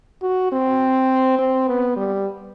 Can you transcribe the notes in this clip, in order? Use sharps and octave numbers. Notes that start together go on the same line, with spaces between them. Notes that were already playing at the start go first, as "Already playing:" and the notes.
F#4
C4
C4
B3
G3